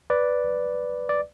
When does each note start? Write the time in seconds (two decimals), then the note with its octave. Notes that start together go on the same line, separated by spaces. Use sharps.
0.10 B4 D5
1.09 D5